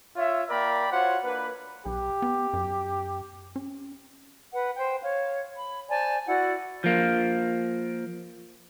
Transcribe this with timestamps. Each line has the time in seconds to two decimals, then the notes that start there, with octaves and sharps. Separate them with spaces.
0.16 F4 C#5 E5
0.50 A#3 A#4 D5 G5 B5
0.91 F4 F#4 C5 C#5 F#5
1.24 A#3 D4 B4
1.86 B1 G4
2.22 B3
2.53 F#2
3.56 C#4
4.52 B4 F#5
4.75 C5 G5
5.01 C#5 F5
5.55 B5
5.89 C5 D5 G#5 A5
6.27 E4 F#4 D5 F#5
6.84 F3 A#3